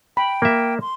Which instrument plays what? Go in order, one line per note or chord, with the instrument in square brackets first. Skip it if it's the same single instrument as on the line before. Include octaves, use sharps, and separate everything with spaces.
[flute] G5 [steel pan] B5
[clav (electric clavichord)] A#3 E5
[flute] C6